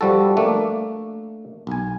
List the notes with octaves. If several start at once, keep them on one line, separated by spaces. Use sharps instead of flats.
F3 G3 F#4 A4
A3 A#3 D4
B1 G#5